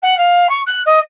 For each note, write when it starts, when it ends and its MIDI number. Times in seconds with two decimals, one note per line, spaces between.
0.02 0.17 78
0.17 0.47 77
0.49 0.61 85
0.66 0.81 90
0.86 0.99 75